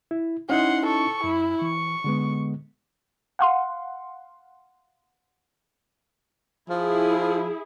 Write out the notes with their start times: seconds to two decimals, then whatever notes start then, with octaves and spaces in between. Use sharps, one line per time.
0.11 E4
0.50 C#4 D#4 E4 F#5 C6
0.86 A4 C#6
1.24 F#2 E4
1.62 E3 C#6
2.04 D3 G#3 B3
3.39 F5 F#5 C6
6.70 F3 E4 G#4